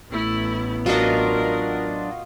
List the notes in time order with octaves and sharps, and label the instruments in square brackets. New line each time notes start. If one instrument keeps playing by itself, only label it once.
[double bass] A1 B3 [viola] A3 E4
[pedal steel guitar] F#3 D4 [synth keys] F4 F#4 D#5 [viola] A#4